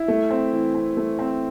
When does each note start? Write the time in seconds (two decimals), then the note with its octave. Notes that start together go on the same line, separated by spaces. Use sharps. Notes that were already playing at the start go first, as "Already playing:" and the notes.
Already playing: E4
0.08 A3
0.31 C4
0.52 E3
0.75 C4
0.97 A3
1.19 C4